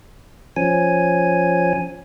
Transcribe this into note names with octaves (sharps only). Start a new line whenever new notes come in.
F3 C#4 G#5